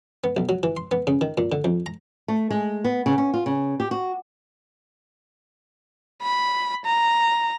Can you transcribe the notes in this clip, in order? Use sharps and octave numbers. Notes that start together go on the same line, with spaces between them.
B3
B1
F#3
E3
C6
B3
C#3
D#3
A#2
D3
F2
A#5
A3
G#3
B3
C#3
C#4
F4
C#3
G4
F#4
B5
A#5